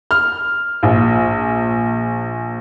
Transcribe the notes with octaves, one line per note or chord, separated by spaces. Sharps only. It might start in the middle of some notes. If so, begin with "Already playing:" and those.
F6
A#1